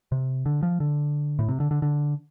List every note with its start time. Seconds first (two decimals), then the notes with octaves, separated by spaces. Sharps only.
0.12 C3
0.46 D3
0.63 F3
0.80 D3
1.39 A2
1.48 C3
1.60 D3
1.71 D3
1.82 D3